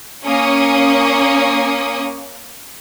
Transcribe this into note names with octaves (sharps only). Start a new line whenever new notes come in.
A#3 C#4 C#6 D#6